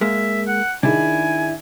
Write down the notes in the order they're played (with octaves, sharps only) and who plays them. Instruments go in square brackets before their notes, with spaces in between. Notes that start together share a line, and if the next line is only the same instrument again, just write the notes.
[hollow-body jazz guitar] G#3 A#3 [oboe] E5
[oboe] F#5
[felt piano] D#3 G#4 [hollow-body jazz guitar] D4 E4 [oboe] G#5